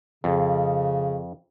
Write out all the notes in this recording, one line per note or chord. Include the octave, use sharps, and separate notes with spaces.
F2 C#3